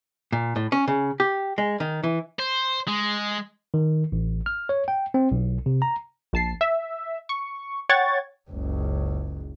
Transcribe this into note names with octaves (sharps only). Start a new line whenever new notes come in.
A#2
A2
C#4
C#3
G4
G#3
D#3
E3
C5
G#3
D#3
A1
F6
C#5
G5
C4
B1
C3
A#5
A#1 A5 C7
E5
C#6
C#5 F#5 G5 C#6 G#6 A6
F#1 C#2